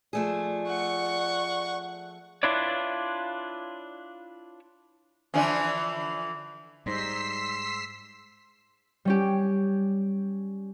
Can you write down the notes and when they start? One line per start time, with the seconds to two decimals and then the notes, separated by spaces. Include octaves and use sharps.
0.13 F3 A3 G#4 D5
0.68 F#5 C#6
2.43 D4 E4 F4 B4 C#5 D5
5.34 D3 E3 F3 C#4 D4 G#5
6.86 G#2 G3 D#4 C5 C6 E6 B6 C7
9.05 G3 C#4 G4